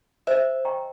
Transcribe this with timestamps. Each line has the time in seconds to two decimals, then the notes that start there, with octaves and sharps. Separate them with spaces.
0.27 C5 E5
0.65 D#5 G5 A#5 C#6